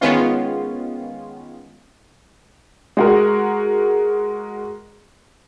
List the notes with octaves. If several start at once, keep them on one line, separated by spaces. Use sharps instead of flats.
D#3 G#3 B3 C#4 F4
G#3 F#4 A#4